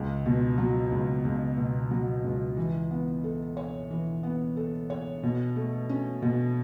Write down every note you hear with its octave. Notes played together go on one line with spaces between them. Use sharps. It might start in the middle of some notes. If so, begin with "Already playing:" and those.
Already playing: C#2
B2
F#3
C#2
C#2
B2
F#3
C#2
E3
B3
A4
C#5
E3
B3
A4
C#5
B2
A3
C#4
B2